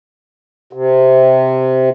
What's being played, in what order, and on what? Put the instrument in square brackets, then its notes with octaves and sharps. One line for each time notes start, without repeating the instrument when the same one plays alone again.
[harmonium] C3